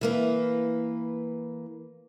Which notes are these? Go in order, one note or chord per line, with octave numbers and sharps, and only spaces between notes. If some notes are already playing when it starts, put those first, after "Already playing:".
E3 A#3 B4